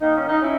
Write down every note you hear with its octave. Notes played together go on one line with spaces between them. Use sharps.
D#3 A#3 D#4
C#4
D#4
C#4 E4